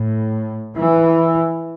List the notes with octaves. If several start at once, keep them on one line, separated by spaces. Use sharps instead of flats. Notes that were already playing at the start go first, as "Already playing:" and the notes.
Already playing: A2
E3